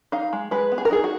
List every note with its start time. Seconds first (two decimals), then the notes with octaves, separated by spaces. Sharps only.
0.12 D#4 F5
0.33 G#3
0.51 G#3 B4
0.72 B3
0.78 G#4
0.85 A#4
0.91 D#4 G#4
1.04 F#4